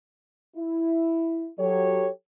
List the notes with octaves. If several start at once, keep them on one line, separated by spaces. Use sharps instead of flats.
E4
F#3 G4 A4 C#5